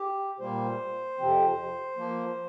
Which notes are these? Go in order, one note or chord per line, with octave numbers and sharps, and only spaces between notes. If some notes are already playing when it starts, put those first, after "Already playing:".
Already playing: G4
A#2 G3 A#3 C5
F2 C3 F3 C4
F3 A#3